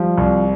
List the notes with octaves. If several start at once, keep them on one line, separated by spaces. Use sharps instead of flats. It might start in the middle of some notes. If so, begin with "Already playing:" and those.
Already playing: F3 G3
C2